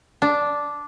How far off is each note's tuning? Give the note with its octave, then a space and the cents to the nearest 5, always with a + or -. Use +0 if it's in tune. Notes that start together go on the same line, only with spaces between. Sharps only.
D4 -5